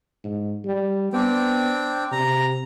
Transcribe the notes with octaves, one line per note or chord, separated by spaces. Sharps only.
G#2
G3
B3 C4 D4 G5
C3 A#5